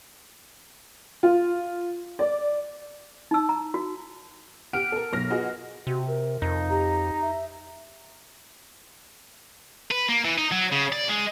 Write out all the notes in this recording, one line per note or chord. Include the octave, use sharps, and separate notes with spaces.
F4
D5
D#4 A5 E6
A#5
F#4
G4 F#5 F6 D7
A4 A#4
B1 F6 A#6
F4 F#4 G#4 B4 D#5
C3 F#4
A#4
F2 D#4
G4 A#5
E5
B4
A#3
E3
D#4
F#3
C#3
D5
G#3